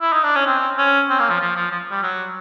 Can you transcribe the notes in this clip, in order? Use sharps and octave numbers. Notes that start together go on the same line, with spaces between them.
E4
D#4
D4
C#4
C4
C#4
C4
A#3
F3
F3
F3
F3
G3
F#3